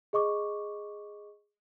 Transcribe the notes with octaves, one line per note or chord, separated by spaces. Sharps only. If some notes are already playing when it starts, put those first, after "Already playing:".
G#4 D#5 C#6 D6